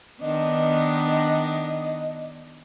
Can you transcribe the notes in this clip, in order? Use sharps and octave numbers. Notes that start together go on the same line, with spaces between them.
D#3 B3 D4 D#5